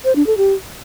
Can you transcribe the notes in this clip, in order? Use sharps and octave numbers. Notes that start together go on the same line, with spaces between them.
C5
D4
A4
G4